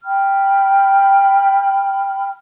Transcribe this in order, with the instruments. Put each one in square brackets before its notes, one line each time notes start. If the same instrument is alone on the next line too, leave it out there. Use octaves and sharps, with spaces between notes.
[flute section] G5 B5 F6